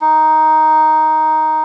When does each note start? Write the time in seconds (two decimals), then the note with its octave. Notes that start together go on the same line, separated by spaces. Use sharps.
0.01 D#4